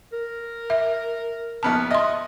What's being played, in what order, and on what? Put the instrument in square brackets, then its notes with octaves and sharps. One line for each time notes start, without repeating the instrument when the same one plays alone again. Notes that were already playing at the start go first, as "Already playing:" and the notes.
[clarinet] A#4
[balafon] E5
[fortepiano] A#1 B3 F6 [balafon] A5
[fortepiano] D#5 [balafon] E5 C6